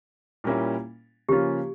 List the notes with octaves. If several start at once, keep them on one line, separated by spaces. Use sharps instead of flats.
A#2 G3 A#3 C#4 E4
C#3 F3 A#3 C#4 F4 G4